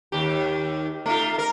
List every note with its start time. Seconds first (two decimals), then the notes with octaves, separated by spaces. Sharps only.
0.12 D#2 G4
1.06 A3 D#4 F4
1.38 A#4